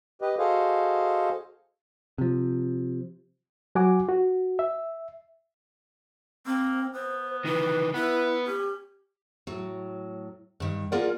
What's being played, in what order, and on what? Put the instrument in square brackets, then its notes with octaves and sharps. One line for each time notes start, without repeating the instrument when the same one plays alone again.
[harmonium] G4 B4 D#5
F#4 G#4 A4 C5 D#5 F5
[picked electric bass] C3 F3
[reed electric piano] F#3 F#4 F#5 G#5 D6
F#4
E5
[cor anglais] A#3 [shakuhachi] C4
[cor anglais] B3 [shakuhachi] C5
[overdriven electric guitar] D#3 E3 [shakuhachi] B4
[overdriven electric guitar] B3 [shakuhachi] E4 [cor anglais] B4
[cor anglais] C#4 [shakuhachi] G4
[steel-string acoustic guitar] A2 F#3
G2 D#3
A#3 F4 G#4 A#4 D5 F#5